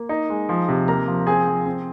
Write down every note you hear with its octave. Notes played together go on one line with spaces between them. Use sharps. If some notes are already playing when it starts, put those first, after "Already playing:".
Already playing: A#3
D#4
G#3
F3
C3
A#3 A#4 A#5
F3
C4 G#4 G#5
F3
C4